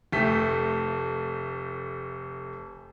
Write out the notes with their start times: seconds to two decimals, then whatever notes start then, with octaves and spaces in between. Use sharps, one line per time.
0.12 F1 A3 G4 B6